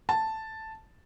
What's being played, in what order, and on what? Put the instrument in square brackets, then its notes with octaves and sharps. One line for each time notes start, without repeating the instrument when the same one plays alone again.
[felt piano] A5